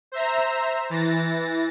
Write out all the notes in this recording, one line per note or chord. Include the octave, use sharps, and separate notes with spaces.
C5 E5 A#5
E3 A6 A#6